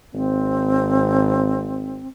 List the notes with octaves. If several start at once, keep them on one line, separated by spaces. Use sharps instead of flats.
G#1 C4